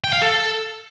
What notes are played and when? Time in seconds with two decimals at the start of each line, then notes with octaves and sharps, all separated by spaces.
0.04 G5
0.13 F5
0.22 A4